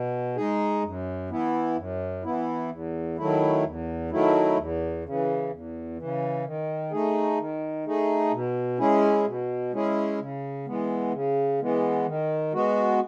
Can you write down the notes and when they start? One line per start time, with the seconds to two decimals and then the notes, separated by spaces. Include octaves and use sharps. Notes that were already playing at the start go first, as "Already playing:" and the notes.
Already playing: B2
0.36 G#3 D#4 G#4
0.83 F#2
1.30 E3 B3 E4
1.77 F#2
2.23 E3 B3 E4
2.70 E2
3.18 D#3 F#3 A3 E4
3.64 E2
4.10 D#3 F#3 A3 E4
4.57 E2
5.04 C#3 E3
5.51 E2
5.98 C#3 E3
6.45 D#3
6.91 A3 D#4 G#4
7.38 D#3
7.85 A3 D#4 G#4
8.32 B2
8.79 G#3 C#4 E4 G#4
9.26 B2
9.73 G#3 C#4 E4 G#4
10.19 C#3
10.66 E3 G#3 B3
11.13 C#3
11.60 E3 G#3 B3
12.06 D#3
12.53 G#3 B3 F#4